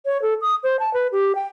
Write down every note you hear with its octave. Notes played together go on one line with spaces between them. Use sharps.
C#5
A4
D#6
C5
A5
B4
G4
G5